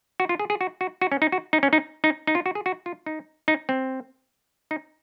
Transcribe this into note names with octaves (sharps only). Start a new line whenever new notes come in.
F#4
F4
G#4
G#4
F#4
F#4
F#4
C#4
D#4
F#4
D#4
C#4
D#4
D#4
D#4
F4
F#4
G#4
F#4
F4
D#4
D#4
C4
D#4